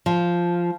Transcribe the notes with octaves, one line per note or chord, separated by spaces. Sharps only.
F3